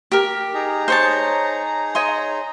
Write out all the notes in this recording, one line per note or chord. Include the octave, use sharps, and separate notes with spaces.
G4 A#4
D#4 G#4 A#5
C5 C#5 A5
C#5 D#5 C6